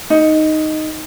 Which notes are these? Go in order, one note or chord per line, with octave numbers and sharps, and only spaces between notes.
D#4